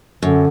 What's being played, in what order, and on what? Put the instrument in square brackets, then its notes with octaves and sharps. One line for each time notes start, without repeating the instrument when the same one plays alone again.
[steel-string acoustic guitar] F#2 [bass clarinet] D3